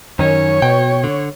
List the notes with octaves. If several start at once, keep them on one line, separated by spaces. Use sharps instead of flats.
F#2 D#3 C#4 C#5
B2 G5
D3